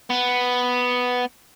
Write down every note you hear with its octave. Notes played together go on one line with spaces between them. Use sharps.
B3